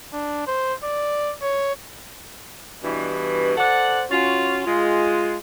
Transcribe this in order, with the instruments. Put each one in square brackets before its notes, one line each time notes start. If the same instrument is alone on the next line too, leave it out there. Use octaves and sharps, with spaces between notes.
[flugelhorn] D4
C5
D5
C#5
[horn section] G2 B2 E3
A4 C5 D5 F#5
C#4 F4 F#4
G#3 F4